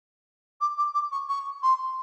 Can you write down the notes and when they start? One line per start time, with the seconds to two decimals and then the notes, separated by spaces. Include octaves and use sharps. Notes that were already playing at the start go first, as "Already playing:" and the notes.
0.61 D6
0.77 D6
0.94 D6
1.11 C#6
1.29 C#6
1.62 C6